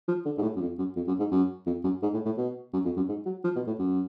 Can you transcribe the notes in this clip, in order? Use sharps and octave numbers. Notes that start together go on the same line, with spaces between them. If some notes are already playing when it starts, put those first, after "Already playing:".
F3
D3
G#2
A2
F#2
F2
F#2
F2
F#2
G#2
F#2
F2
F#2
G#2
A2
A2
B2
F#2
F2
F#2
G#2
F#3
F3
B2
A2
F#2